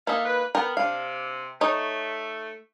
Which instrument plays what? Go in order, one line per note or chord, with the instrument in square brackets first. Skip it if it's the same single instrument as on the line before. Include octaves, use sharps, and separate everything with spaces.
[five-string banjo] A#3 D#4 [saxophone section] A4 E5 F5
[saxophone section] B4
[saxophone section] B3 [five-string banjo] A#4 G5
[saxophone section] C3 [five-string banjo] D4 F5
[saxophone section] A3 [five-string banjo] D#4 C#5